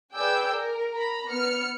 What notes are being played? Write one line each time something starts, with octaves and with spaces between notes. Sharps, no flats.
G#4 B4 D5 G5 E6 G6
A#4
A#5 B5
B3 F6 C#7